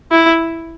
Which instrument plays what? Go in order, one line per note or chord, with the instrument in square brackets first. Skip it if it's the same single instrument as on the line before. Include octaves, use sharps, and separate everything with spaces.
[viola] E4